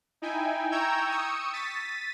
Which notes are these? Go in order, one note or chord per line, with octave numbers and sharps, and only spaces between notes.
D#4 E4 G5 G#5
G5 A#5 C#6 E6 G6 G#6
C#6 D#6 E6 C#7
A6 B6 D#7